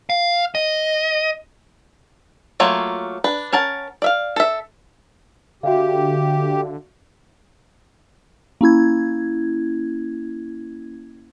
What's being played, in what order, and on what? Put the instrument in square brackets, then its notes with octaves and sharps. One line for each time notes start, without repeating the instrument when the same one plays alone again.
[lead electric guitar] F5
D#5
[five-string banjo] F#3 A3 A#3 F4
D4 B4
C#4 A#4 F#5 A5
D5 E5 F5
A4 E5
[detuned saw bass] D3 [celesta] F#4 E5 F5 [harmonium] G4
[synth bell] A#3 C#4 E4 G#6